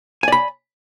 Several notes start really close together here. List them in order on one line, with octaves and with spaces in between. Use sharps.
G#5 D5 B5